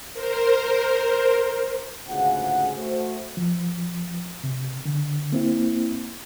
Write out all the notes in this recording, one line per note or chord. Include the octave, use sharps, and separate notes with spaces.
A#4 C5
D2 G#2 C#3 F4 G#4 F#5
A3 F#4 C5
F3
C3
D3
A#3 C4 E4